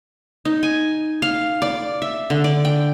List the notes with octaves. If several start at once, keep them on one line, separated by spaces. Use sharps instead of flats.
D#4
G#5
F5
D5
E5
D3
D5
G5